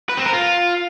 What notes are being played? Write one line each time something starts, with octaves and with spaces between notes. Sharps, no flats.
B4
C4
A#4
F4